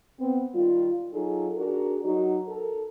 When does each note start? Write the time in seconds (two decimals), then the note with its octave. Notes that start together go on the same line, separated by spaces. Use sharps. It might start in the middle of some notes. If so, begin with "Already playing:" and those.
0.20 B3 C4
0.54 D#3 G3 F4
1.12 F#3 D#4 F4 G#4 A4
1.56 D4 F#4 G#4 A#4
2.04 F#3 D#4 F#4
2.47 A4 A#4